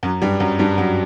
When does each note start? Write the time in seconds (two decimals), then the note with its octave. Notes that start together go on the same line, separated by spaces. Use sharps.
0.03 F#2 F#3
0.22 G2 G3
0.40 F#2 F#3
0.59 G2 G3
0.78 F#2 F#3